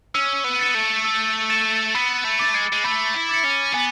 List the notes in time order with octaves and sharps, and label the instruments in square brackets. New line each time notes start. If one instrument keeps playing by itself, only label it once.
[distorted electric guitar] C#4 [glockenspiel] E6
[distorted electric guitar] B3
[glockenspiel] A6 C#7 E7
[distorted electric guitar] A3
[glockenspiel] E6
A6 C#7 E7
[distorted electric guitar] B3 [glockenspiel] B5
[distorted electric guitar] A3
[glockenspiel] D6 A6 C#7
[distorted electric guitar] G#3
G#3
[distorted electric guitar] A3 [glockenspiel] B5
[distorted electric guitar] E4
[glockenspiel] D6 A6 C#7
[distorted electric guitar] C#4
[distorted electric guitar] B3 [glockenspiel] G#5